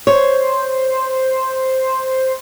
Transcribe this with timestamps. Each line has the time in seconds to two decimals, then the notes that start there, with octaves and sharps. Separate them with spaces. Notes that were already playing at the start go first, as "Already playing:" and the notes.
0.07 C5 C#5